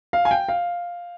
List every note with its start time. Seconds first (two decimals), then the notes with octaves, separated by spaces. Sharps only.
0.13 F5
0.25 G#5
0.31 G5
0.48 F5